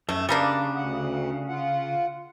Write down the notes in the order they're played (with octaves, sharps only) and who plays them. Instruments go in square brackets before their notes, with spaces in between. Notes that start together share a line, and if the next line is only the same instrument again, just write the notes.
[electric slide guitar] F#2 [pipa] A3
[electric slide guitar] C#3 [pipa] G3 A#3 D4
[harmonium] D2 F#5
F4 F#5